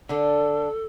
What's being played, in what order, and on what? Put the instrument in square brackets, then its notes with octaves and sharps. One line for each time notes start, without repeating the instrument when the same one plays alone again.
[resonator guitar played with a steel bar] D3 D4 [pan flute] A4